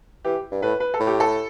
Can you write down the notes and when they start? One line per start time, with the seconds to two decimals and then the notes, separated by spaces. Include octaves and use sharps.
0.25 E3 G4
0.51 G2
0.62 A2 B4
0.80 B4
0.94 A4
1.00 A2
1.07 G4
1.20 A4